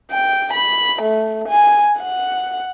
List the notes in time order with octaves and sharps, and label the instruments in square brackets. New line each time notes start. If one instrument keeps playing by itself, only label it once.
[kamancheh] G5
B5
A3
G#5
F#5